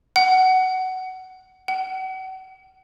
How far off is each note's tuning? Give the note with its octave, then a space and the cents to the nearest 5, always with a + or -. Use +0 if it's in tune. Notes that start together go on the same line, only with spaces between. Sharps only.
F#5 +15
F#5 +35